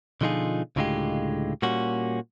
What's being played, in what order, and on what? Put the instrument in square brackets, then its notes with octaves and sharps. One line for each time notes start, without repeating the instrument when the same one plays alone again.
[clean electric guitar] B2 D3 F3 D#4 F4 G#4
C#2 A2 D3 G#3 F4 G4
A#2 G3 A#3 C#4 F#4